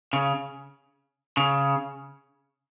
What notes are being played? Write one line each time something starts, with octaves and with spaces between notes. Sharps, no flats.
C#3
C#3